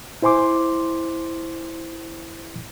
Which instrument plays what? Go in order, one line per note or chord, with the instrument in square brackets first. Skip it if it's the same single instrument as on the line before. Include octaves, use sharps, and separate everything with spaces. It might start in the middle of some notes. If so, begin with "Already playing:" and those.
[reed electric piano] E4 C5 G#5 C6 D6